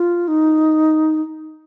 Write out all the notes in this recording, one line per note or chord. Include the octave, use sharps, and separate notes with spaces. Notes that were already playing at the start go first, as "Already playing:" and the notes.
Already playing: F4
D#4